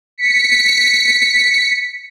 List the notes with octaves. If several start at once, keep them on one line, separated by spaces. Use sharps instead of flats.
B6 C#7